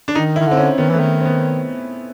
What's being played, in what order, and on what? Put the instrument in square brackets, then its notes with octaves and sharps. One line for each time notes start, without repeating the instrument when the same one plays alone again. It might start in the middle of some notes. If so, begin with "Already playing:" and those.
[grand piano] D4
[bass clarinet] D#3 [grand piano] D#4
[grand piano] E4
[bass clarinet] D#3
[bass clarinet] D3 [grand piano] C4
[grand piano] C#4
[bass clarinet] D#3 [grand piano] B3
[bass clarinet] E3 [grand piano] A3
[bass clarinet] D#3
[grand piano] C4
B3